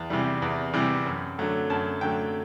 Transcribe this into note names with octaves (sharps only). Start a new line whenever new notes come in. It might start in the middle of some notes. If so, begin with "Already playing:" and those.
Already playing: E2
C3 E3 G3
E2
C3 E3 G3
F#2
D3 F#3 A3
F#2 A5
D3 F#3 A3 G5